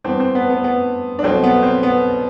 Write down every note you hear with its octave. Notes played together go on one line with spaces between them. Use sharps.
G2 E3 B3 C4
C4
B3
B3
B3
D4
C2 B2 F#3 A3 C4
B3
C4
B3